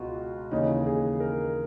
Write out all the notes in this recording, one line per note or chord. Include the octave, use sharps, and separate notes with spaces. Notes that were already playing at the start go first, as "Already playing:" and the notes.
Already playing: C#2 B2 F4 F#4
D#2 C#3 E3 D#4
G#4
A#4